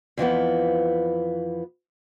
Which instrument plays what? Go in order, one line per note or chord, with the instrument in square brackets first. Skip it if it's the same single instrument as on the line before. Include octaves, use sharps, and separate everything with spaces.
[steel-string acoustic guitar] F2 E3 F3 B3